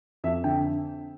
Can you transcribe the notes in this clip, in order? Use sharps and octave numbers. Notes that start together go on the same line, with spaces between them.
F2 E5
D3 G5